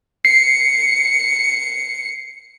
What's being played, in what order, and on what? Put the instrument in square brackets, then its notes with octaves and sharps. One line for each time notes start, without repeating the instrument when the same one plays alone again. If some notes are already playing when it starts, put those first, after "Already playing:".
[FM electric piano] C7 [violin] C#7